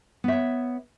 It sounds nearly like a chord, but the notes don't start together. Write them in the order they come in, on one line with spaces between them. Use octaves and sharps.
B3 E5 C#5